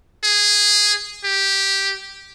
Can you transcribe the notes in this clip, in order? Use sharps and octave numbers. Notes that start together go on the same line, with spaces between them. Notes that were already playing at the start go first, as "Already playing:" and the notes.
G#4
G4